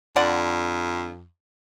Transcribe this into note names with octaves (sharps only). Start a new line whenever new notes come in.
F2 D3 D5 F#5